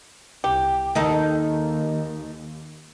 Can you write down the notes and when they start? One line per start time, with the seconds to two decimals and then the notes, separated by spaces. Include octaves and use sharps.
0.44 C2 G4
0.95 D#2 D#3 D#4 A4